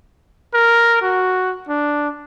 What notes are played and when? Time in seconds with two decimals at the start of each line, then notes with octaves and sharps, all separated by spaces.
0.54 A#4
1.02 F#4
1.69 D4